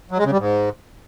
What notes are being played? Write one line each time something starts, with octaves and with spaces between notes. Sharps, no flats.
F#3
G#3
C#3
G3
G#2